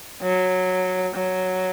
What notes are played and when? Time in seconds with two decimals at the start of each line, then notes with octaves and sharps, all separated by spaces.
0.22 F#3
1.15 F#3